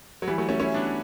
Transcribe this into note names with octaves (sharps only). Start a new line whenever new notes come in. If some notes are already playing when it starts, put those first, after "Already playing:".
F#3
E3 G3
F#3 A3
A3 C#4
C#4 E4
B3 D4